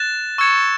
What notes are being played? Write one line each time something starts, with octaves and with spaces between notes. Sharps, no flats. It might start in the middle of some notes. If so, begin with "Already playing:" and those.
Already playing: F#6 A6 E7
C#6 E6 G#6 C#7 E7